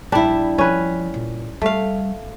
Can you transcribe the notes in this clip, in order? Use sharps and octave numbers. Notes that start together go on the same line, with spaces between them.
A#1 G3 D4 E4
F3 C#4 B4
A#2
G3 A3 F5